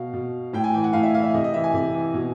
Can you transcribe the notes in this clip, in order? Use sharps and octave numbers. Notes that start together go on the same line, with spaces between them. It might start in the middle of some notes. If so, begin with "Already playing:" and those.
Already playing: B2 F5
B2
A2 G5
G#5
E3 G5
F#5
A2 F5
E5
E3 F5
E5
C3 D#5
D#5
E3 E5
G#5
C3
E3
B2